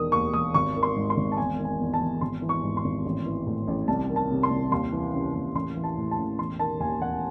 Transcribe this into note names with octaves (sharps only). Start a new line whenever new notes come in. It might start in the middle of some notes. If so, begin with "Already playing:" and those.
Already playing: E1 D#3 D#6
D#2 C#6
E1 D#6
G#1 C#6
D#3
C6
G#2
C6
G#1
A5
E1 G#5
D#3
G#5
E2
A5
E1
G#1 C6
E3
C#6
G#2
C6
G#1
A1
E3
A2
A1
C2 A5
D#3
A5
C3
C6
C2
D#2 C6
E3
C#3
D#2
A1 C6
E3
A5
A2
A5
A1
E1 C6
D#3 A5
D#2 G#5
E1 F#5